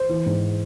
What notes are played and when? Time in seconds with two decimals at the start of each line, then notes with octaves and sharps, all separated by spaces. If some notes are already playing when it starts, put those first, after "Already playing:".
Already playing: C5
0.09 E3
0.26 G#2